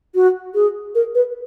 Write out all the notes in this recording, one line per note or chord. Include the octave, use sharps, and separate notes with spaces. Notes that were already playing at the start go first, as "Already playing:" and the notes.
F#4
G#4
A#4
B4